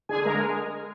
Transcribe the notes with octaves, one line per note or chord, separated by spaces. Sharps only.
D3 G#4 G#5
G#3 A#4 A#5